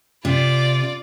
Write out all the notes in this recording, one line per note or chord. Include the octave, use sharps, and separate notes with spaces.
C3 F4 D5